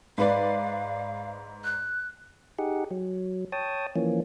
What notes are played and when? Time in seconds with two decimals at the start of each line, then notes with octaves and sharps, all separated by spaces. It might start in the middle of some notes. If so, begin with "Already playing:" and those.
0.18 G#2 B4 D5 F5
1.64 F#6
2.59 D#4 G4 G#4 F#5
2.91 F#3
3.52 C#5 G5 A5 D#6
3.96 E3 F3 A#3 C#4